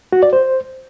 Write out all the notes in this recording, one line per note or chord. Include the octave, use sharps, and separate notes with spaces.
F#4
D5
C5